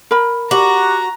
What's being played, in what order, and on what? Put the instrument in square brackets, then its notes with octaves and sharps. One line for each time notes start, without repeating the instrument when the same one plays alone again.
[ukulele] A#4 B5
[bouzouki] F#4 [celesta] G4 D6 F#7 [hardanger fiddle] A#5